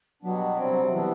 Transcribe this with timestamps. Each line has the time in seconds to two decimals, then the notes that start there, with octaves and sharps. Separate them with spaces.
0.22 B2 F#3 G3 B3 D4
0.57 C3 G3 C4
0.92 C3 E3 G3 B3 D4